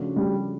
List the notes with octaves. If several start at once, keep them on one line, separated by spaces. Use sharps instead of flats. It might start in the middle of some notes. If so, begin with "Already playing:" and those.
Already playing: C#3 F3 A3 D4 F#4
G3